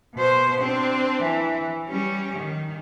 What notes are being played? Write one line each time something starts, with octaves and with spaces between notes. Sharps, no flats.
B2 C5
C4 D4
E3
G3 C#4
D#3